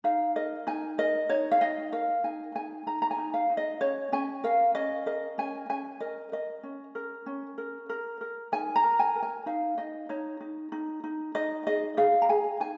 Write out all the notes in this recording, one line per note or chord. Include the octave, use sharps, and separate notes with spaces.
D#4 F5
A#4 D#5
D#4 G#5
A#4 D#5
D#4 C#5
F5
D#4 D#5
A#4 F5
D#4 G#5
D#4 G#5
D#4 A#5
A#5
G#5
D#4
F5
D#4
D#5
C#4 C#5
C#4 G#5
A#4 F5
C#4 D#5
A#4 D#5
C#4 G#5
C#4 G#5
A#4 D#5
A#4 D#5
C#4
A#4
C#4
A#4
A#4
A#4
D#4 G#5
A#5
A#4
G#5
A#4
G#5
D#4 F5
D#4 D#5
D#4 C#5
D#4
D#4
D#4
D#4 D#5
G#4 D#5
G#4 F5
A#5
G#4 G#5
D#4 G#5